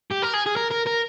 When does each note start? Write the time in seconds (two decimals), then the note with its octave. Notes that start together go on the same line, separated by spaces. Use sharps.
0.11 G4
0.22 A#4
0.33 G#4
0.46 G#4
0.56 A#4
0.71 A#4
0.87 A#4